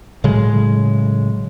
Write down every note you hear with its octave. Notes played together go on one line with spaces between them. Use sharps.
A2 C#3 F#3 G#3